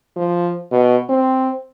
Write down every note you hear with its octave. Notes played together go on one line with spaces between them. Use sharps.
F3
B2
C4